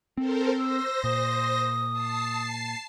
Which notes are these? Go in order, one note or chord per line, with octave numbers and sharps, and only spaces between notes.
C4 A4 A#4 C5
C5 E6 A#6
A#2 D#6
A5 C7